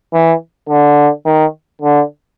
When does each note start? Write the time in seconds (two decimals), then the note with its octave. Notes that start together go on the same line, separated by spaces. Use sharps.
0.13 E3
0.69 D3
1.26 D#3
1.82 D3